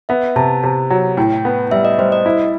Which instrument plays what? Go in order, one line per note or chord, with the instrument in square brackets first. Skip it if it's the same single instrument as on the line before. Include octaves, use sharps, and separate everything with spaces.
[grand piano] B3 [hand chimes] E5
[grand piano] C3 [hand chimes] A5
[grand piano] C3
F#3
[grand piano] A2 [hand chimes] G5
[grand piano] B3
[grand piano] G3 [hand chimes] E5
[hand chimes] D#5
[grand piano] G3 [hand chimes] C5
[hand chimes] D#5
[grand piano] E4